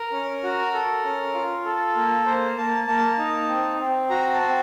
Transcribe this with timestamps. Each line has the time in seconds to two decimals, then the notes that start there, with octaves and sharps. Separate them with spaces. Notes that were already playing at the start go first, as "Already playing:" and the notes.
Already playing: A#4
0.12 C#4
0.43 F#4
0.74 A4
1.04 C#4
1.34 F4
1.65 A4
1.96 A#3
2.26 A#3 C5
2.57 A#3 A5
2.87 A#3 A5
3.18 D#4
3.49 C4
3.79 C4
4.10 F#4 A#5
4.33 A5
4.40 C4